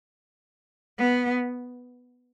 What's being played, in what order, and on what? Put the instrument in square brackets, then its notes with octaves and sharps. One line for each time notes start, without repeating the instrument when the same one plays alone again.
[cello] B3